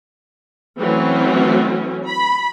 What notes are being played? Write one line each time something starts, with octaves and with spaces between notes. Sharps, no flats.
E3 F#3 A3 C4 C#4
B5